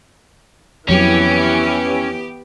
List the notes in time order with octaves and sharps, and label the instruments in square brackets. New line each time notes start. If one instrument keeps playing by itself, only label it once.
[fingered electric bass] F2 F#3 [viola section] E3 [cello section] B3 G4 [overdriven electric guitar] C#4